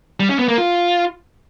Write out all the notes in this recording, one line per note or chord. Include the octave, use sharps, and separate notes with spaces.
G3
C#4
B3
A#3
F4